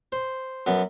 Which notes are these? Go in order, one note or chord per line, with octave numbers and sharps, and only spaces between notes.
C5
F#2 B3